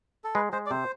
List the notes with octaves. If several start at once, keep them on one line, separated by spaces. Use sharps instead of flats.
A4
G#3 B4
G#3 C5
D5
C3 C5